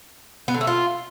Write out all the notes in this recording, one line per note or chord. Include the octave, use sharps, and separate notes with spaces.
B3
D3
A3
F4